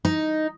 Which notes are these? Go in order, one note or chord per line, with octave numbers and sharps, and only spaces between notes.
D#4